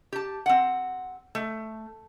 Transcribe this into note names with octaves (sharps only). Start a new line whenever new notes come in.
G4 A5
C4 F#5
A3